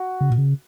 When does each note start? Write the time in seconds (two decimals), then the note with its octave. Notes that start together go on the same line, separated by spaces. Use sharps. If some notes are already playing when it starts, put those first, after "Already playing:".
Already playing: F#4
0.21 C#3
0.30 A#2
0.38 C#3